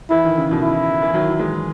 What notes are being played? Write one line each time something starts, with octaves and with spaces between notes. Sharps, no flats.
E3 E4
D#3
C#3
B2 D#3
E4
E3
D#3 F#3
E3 G#3